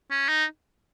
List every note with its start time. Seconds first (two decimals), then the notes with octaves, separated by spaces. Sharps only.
0.11 C#4
0.29 D#4